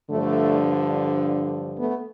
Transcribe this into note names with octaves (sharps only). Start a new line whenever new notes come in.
G2 D3 F3 A3
A3 B3